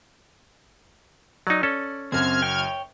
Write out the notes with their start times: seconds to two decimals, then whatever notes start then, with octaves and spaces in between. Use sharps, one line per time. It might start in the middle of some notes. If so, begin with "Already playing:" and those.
1.47 F#3 D#4 D5
1.63 C#4 A4
2.12 F#1 F#2 C4 F#4 F6 G#6
2.42 C#5 G5